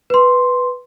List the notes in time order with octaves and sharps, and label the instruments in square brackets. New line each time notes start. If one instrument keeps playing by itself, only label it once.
[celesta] B4 C6